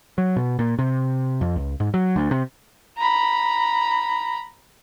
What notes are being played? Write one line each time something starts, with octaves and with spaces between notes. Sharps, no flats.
F#3
B2
A#2
C3
F2
C#2
G#2
F#3
D2
C3
A#5 B5